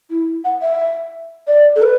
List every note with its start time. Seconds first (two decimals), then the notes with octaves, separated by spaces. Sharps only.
0.10 E4
0.44 F#5
0.62 E5
1.47 D5
1.76 A4
1.82 B4